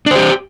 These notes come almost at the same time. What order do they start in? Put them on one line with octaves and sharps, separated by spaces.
D4 C5 G4